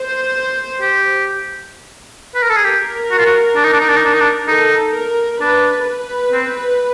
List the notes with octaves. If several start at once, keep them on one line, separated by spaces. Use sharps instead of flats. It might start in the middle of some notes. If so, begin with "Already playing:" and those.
Already playing: C5
G4
B4
A#4
A4
G#4
G4 A#4
F#4
F4
F#4
D4
D#4
D4
D#4
D4
D#4
D4
D#4
D4
D#4 A4
A#4
D4 B4
B4
C4